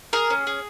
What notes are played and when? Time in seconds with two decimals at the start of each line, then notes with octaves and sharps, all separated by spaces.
0.13 G#4 A#4
0.30 C#4
0.47 G#4